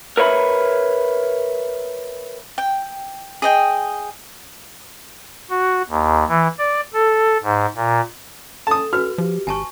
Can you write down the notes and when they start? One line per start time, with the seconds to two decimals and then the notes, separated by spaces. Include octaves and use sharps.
0.17 A#4 B4 C#5 E5 B5
2.58 G5
3.42 G#4 D#5 G5
5.50 F#4
5.90 D#2
6.28 E3
6.59 D5
6.93 A4
7.43 G#2
7.76 A#2
8.67 A4 A5 D#6
8.93 F#4 B4 F6
9.18 F3 G4
9.47 G#1 G#5 A5 C#6